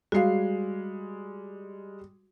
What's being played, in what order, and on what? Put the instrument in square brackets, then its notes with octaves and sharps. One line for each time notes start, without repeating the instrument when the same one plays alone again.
[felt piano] G3 G#3 C7 [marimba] F#4 F5